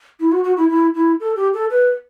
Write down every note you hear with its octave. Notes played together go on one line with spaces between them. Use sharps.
E4
F#4
F#4
E4
E4
E4
A4
G4
A4
B4